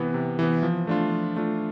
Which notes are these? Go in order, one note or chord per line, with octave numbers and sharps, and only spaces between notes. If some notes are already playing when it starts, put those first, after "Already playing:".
Already playing: C3 E3 B3
C3
E3 B3
F3
A3 D4 F4
F3
A3 D4 F4